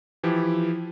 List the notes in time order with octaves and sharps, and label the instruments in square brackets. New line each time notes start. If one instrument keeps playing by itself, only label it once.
[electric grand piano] E3 F3 E4 G4